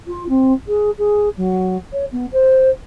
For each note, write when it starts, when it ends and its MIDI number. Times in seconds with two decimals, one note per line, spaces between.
0.07 0.27 65
0.29 0.53 60
0.67 0.90 68
0.98 1.29 68
1.37 1.77 54
1.93 2.05 73
2.12 2.26 59
2.32 2.70 72